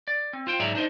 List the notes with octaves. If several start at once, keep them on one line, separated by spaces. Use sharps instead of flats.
D5
C4
F4 C5 G5
G#2 F#3 G#4 D5 E5 A#5
D4 D#4 C5 D#5